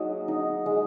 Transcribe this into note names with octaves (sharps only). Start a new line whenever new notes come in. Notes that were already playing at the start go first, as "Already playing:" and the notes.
Already playing: F#3 A#3 D#4 F#4 G#4
D#4
G#3